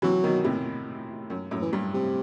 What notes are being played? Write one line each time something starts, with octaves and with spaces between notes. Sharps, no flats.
C3 E3 F#3
B2 D#3
A2 C3
F#2
F#2 A2
E3
G2
C3